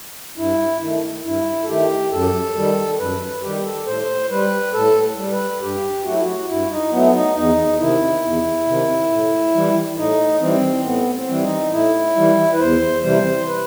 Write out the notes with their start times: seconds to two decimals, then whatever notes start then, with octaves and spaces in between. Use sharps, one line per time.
0.37 G2 E4
0.80 D#3 A3
1.24 G2 E4
1.63 A4
1.68 D#3 A3 G4
2.12 F#2 A4
2.55 D#3 G3
2.99 F#2 B4
3.20 B4
3.43 D#3 G3 G4
3.65 A4
3.87 A2 C5
4.30 G3 B4
4.73 A2 A4
5.18 G3
5.32 B4
5.61 G2 G4
6.04 F#3 A3 F#4
6.13 E4
6.22 F#4
6.48 G2 E4
6.70 D#4
6.91 F#3 A3 B3
7.14 D#4
7.35 E2 D#4
7.79 C3 D#3 E4
8.23 E2
8.67 C3 D#3
9.10 A2
9.54 E3 G3
9.97 A2 D#4
10.41 E3 G3 C4
10.84 A2 B3
11.14 C4
11.29 E3 G3
11.43 D#4
11.72 A2 E4
12.16 E3 G3
12.53 B4
12.60 E2 C5
13.03 C3 E3 G3 C5
13.47 B4